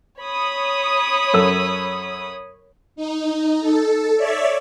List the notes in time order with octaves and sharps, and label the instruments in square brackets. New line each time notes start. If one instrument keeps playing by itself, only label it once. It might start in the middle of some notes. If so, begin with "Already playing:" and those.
[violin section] C#5 B5 D#6
[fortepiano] F#2 A4 E6
[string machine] D#4
A4
C#5 D5 E5